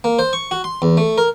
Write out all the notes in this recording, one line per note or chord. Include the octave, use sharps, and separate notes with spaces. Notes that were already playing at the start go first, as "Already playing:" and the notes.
A#3
C5
C#6
F#4
C6
E2
A3
A#4